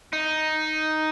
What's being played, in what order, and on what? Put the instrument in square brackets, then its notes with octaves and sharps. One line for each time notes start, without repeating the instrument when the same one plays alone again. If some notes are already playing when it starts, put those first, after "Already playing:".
[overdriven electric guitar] D#4